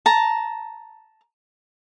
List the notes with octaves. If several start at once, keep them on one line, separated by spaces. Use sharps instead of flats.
A5 A#5